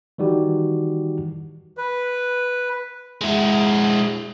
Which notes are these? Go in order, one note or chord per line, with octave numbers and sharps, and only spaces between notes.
D#3 E3 G3 D#4 F#4 G4
B4
G#3 E4